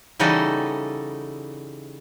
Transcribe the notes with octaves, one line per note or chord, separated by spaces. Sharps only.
C#3 E3 G3 D#4 F#4 A4